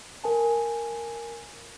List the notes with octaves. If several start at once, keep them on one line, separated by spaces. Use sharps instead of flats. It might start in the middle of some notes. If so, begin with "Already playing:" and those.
A#4 G#5 A5